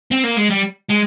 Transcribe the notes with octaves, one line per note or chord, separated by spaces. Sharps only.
C4
A#3
G#3
G3
G#3